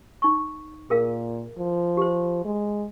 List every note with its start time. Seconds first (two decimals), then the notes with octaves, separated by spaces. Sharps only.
0.22 D#4 C#6
0.90 A#2 G#4 A#4 F5
1.58 F3
1.97 G4 C5
2.45 G#3